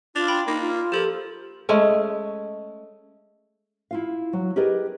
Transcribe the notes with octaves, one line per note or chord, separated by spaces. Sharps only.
D4 F4 F7
G5 B5 C6
A#3 D#4
F4
F3 G4 A4
G#3 A3 C#4
E4 F4 F5
F#3
G4 G#4 A#4 B4 D5 D#5